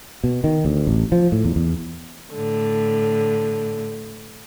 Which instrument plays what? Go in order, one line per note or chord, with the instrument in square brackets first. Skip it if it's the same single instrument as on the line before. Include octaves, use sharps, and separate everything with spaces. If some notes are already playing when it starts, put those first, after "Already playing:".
[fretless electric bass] B2
D#3
D2
A1
F3
A2
E2
E2
[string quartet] A2 D3